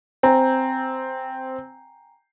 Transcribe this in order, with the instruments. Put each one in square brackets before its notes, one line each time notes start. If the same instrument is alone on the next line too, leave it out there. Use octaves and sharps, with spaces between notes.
[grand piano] C4 [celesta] G5 G#5 A#5